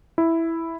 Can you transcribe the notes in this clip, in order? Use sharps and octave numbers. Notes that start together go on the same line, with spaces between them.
E4